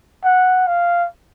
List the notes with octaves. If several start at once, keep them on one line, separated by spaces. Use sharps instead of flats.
F#5
F5